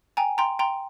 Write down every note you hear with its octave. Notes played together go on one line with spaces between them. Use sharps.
G5 G#5 A#5
G5 A#5 C6
G5 A#5 C6